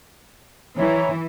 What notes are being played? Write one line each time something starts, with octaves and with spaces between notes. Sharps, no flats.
E3 E4 C#5 A#5